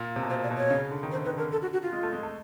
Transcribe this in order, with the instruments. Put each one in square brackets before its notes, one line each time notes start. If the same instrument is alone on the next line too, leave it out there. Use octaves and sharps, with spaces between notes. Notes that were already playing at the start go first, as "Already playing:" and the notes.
Already playing: [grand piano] A#2
C3
B2
[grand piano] A#2 [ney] C5
[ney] D5
[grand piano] B2
[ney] C#5
[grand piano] C#3
D3
D#3
[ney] C5
[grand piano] D3
[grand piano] D#3 [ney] B4
[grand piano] D3 [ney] A#4
[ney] A4
F#4
F#4
F4
[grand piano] G#3
A3
G#3
A3